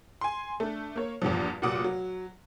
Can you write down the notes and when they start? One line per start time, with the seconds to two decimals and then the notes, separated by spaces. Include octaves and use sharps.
0.21 G#5 C6
0.60 A3 D4
0.96 A#3 C#5
1.22 E2 G2 A#2 F3
1.62 F1 A#2 F#3 F#5 D6 D#6
1.84 F#3